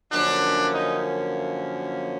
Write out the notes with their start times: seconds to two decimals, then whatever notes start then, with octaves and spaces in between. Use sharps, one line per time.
0.12 F#2 D3 F3 A#3 C#4 D4
0.73 D#4